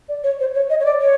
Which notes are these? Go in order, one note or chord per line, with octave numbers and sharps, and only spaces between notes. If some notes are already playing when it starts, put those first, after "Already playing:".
D5
C#5
C5
C#5
D#5
C#5
D5
C#5